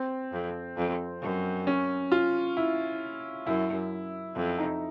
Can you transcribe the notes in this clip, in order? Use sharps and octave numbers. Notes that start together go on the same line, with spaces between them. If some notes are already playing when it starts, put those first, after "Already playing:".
Already playing: C4
F2
F2
F#2
C#4
F4
E4
F#2 E4
F2
D#4